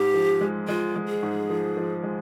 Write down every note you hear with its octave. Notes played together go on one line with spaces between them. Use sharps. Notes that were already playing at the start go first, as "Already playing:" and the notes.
Already playing: G#2 G4
F3
G#3
G#3 F4
G#3
G#4
G#2
F3
F3
G#3